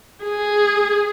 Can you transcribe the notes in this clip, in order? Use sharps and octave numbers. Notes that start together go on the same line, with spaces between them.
G#4